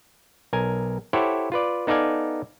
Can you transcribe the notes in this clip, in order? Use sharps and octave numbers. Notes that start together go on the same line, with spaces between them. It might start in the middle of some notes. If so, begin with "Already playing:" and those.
B1 A#4 G#5
E4 G4 A4 C5 C#5 F#5
F4 B4 D5
B3 D#4 A4 D5 F5 G#5